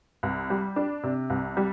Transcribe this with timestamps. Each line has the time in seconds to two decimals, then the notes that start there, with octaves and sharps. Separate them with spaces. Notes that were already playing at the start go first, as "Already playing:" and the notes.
0.23 C2
0.50 G3
0.76 D4
1.03 C3
1.30 C2
1.57 G3